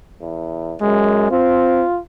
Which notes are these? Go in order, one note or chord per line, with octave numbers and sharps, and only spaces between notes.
E2
F#2 G#3
C4 F4